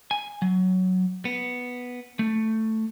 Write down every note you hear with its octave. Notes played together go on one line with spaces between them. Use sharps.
G#5
F#3
B3
A3